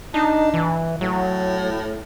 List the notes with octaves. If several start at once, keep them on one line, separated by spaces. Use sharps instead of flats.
D4 D#4
E3
A2 F#3